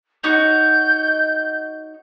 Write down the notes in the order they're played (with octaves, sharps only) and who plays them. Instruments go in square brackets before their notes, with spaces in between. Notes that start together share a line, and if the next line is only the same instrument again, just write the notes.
[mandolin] D#4 F#4 C#5 [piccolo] G6